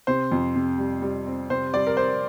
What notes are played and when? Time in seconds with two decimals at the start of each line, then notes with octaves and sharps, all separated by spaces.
0.07 C3 C5
0.32 F2
0.55 C3
0.78 G3
1.02 G3
1.26 C4
1.50 C3 C5
1.74 G3 D5
1.87 A#4
1.97 C4 C5